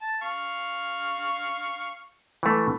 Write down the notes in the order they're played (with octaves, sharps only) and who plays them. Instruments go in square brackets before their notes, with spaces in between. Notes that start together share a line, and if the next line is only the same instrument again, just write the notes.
[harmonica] A5
F5 C#6
[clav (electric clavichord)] E3 A3